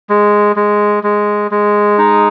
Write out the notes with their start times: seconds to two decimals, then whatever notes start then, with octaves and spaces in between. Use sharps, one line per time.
0.09 G#3
0.56 G#3
1.03 G#3
1.51 G#3
1.98 D#4